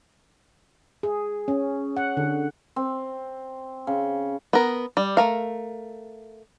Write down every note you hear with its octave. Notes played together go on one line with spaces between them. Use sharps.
G#4
C#4
F#5
D3
C4
C#3
B3 A#4
G3
A3 A#4 F5